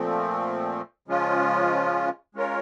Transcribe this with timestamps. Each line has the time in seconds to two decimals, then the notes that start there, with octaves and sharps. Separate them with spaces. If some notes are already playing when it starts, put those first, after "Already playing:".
Already playing: A#2 F3 A3 C4
1.08 C#3 F3 G#3 C#4 F4
2.35 G#3 C#4 F4 A#4 C#5